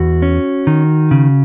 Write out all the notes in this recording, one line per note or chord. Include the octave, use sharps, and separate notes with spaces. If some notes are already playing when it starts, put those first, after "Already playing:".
Already playing: E2 F#4
C#4
D#3
C#3